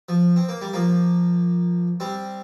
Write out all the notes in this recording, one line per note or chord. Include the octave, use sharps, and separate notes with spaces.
F3
C4
A#3
G3
F3 A#3
G3 C4